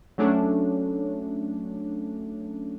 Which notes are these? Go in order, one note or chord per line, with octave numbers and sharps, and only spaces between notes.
F#3 A3 C#4 D4